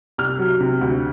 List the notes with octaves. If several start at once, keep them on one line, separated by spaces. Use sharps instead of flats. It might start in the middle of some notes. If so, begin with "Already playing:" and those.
C2 F6
F#3
C3
D2